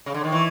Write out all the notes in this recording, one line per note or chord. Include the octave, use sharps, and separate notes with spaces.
C#3
D3
D#3
E3